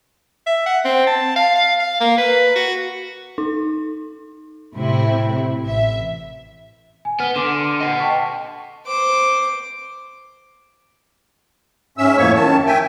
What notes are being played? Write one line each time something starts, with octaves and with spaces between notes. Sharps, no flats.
E5
F#5
C4
A5
F5
F5
F5
A#3
B4
F#4
D#4
A2 C3 C4 E4
A1 E5
G#5
B3 F6 G7
D3 C6 D6 F6
D#5 F#5
G5 A5 C#6
C5 D6
G#2 C#4 E5 E6
F2 A2 A#3 C#5 C#6
F#2 D#3 A5
E5 G5 G#5